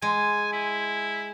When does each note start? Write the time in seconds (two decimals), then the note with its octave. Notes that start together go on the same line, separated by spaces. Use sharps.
0.02 G#3 G#5
0.53 E4